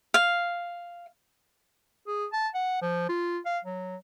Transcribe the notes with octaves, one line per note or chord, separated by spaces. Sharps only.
F5
G#4
A5
F#5
F3
F4
F5
F#3